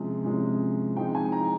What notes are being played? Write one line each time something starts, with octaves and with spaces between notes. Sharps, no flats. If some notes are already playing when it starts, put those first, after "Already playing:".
Already playing: C3 F3 G#3 C#4
C3 F3 G#3 C#4
F3 G#3 C4 D#4 G5
G#5
A#5